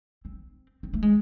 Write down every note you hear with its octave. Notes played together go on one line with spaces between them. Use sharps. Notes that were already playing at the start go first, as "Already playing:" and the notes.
C4
C4
A3
G#3